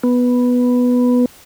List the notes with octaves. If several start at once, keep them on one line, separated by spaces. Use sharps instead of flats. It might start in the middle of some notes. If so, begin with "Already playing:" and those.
B3